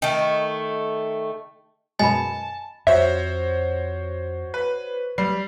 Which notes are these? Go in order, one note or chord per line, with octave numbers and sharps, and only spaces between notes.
D#3 A3
F#2 B2 G#3 D#5 G#5 A5 B5
F2 F#4 C5 C#5 E5
B4
F#3 G3 C7